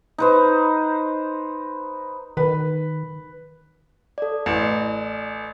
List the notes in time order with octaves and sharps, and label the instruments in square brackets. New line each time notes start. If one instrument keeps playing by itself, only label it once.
[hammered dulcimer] D#4 B4 C5
[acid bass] D#3 [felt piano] B4
[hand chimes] A4 D5
[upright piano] A1